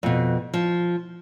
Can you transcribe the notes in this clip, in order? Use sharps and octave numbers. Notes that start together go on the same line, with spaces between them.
F2 B2
F3